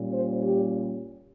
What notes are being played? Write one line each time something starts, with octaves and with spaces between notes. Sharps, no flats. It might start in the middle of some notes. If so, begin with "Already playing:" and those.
Already playing: A#2 G3 C#4
C5
G4